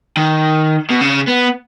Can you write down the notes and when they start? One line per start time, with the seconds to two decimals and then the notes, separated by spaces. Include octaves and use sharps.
0.17 D#3
0.90 B2
1.01 C#3
1.27 B3